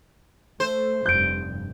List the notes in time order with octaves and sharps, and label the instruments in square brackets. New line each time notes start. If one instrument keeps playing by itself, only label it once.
[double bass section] A3 [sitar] C5
[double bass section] F1 G2 [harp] G6 D7